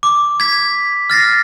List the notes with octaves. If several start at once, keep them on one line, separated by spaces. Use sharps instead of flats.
D6
G#6 B6
F6 A6 A#6 C7